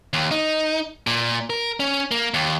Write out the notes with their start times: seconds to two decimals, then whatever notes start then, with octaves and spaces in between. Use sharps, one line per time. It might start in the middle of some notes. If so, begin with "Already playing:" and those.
0.13 D#2
0.31 D#4
1.07 A#2
1.50 A#4
1.80 C#4
2.11 A#3
2.34 D#2